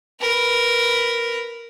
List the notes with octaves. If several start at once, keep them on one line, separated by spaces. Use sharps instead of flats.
A#4 B4